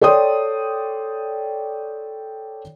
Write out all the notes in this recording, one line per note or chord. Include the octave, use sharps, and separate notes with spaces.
A4 C#5 D5 G5 C6 D#6